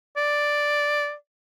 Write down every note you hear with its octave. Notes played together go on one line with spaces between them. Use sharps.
D5